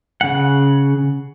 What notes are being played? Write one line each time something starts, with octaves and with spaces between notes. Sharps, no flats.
C#3 F#5